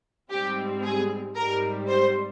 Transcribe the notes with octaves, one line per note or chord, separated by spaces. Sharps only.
G#2 G3 C4 G4
G#4
G#2 G3 C4 A#4
C5